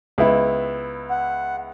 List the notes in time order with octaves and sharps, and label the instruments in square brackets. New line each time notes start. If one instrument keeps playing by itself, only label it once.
[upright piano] C#2 B3 E4
[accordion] F#5